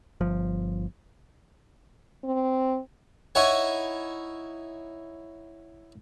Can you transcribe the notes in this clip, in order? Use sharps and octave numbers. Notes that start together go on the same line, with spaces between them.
G1 F3
C4
D#4 E4 C#5 F#5 G#5